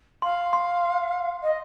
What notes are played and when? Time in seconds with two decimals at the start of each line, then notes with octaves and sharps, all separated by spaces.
0.22 F5 C6
0.53 C6
1.43 D#5